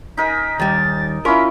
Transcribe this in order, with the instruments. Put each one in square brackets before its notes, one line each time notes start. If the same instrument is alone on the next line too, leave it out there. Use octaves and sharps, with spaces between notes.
[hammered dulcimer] D#4 A#4 G#5 [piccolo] B6
[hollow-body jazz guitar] D#2 G3 [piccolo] A6
[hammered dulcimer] C#4 [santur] E4 F4 [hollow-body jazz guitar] A#4 [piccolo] B6